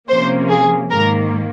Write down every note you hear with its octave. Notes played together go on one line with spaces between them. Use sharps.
C3 F3 A#3 C#4 C5
G#4
G#2 D#3 A#3 A#4